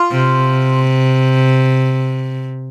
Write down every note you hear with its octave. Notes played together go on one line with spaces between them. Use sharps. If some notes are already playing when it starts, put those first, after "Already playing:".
Already playing: F4
C3